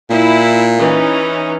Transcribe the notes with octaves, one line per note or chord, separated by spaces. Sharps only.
A#2 E4
E3 C#4 D#4